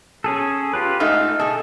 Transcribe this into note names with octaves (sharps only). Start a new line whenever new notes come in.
C#4 G#4 A4
F4 G4 B4
G#2 A3 D#4 F5
B2 G#4 A4